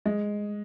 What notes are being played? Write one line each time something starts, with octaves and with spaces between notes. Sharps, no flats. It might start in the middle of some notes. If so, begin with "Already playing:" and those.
G#3